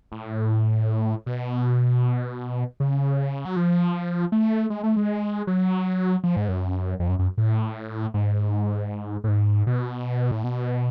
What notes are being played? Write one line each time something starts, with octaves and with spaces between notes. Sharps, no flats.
A2
B2
C#3
F#3
F3
A3
G#3
A3
G#3
F#3
F3
G#2
F#2
F2
F#2
F#2
A2
G#2
A2
G#2
B2
A2
B2